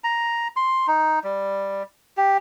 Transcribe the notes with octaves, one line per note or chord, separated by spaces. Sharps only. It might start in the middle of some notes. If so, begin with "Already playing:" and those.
A#5
C6
D#4
G3
G4